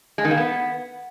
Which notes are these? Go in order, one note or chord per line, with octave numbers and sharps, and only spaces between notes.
G#3
D#3
A#3
B3